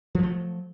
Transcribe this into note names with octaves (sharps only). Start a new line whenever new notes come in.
F3 F#3 A3